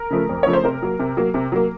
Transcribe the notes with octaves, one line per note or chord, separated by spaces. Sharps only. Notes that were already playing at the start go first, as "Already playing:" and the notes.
Already playing: A#4
C#3 F3 A3
F2
C#3 F3 A3 C#5
C5
C3 A#4
F#3 A#3
C3
F#3 A#3
C3
F#3 A#3